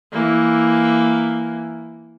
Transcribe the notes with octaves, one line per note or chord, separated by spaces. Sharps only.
E3 A#3